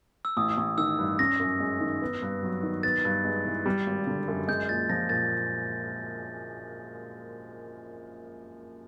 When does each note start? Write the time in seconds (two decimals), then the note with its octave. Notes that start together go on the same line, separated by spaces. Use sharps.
0.25 E6
0.37 A1 D#6
0.57 A1
0.78 D#3 E6
0.99 G2
1.19 C#4 A#6
1.40 F#2
1.60 G#3
1.80 D#3
2.02 B3
2.22 G2
2.43 F#3
2.63 D#3
2.83 B3 A6
3.05 G2
3.25 G#3
3.45 E3
3.66 G3
3.86 G#1
4.07 D3
4.28 F#2
4.48 G#3 G6
4.69 A#1 A6
4.89 F3 A#6
5.09 A#2 A6